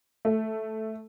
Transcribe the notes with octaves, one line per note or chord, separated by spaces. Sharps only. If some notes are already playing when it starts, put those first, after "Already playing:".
A3